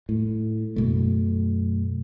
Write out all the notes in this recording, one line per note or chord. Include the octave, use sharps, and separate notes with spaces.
A2
F#2 B2 A3